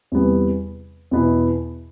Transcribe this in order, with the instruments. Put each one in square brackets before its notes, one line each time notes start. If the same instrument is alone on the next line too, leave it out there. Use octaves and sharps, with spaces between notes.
[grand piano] E2 C3 G3 B3
E2 B2 B3 E4